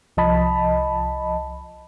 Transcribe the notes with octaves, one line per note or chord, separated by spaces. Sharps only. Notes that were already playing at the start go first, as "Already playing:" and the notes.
C2 F3 D#5 A5 B5